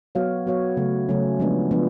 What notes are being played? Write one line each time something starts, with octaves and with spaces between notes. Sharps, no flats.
F#3 B3 F#4 C#5 F5
F#3 B3 F#4 C#5 F5
C#3 F#3 A3 C#4
C#3 F#3 A3 C#4
F3 G#3 B3 D4
F3 G#3 B3 D4